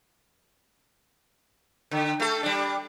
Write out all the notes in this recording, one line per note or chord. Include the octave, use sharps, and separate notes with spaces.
D3
A3 A4
G3 D4